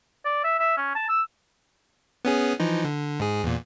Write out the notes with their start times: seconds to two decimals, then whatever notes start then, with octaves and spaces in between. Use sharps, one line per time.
0.25 D5
0.44 E5
0.59 E5
0.77 C#4
0.95 A5
1.09 E6
2.25 B3 C#4 G#4
2.60 E3 F3 D#4
2.84 D3
3.20 G#2 G#4
3.43 E2 A#2